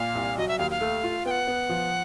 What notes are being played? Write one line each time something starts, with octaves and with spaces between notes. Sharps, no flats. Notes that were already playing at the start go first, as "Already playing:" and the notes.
Already playing: A#2 F5
C2
F#3 D#5
E5
D#2 F5
F5
A3
F4
B3 G5
F#5
B3
F3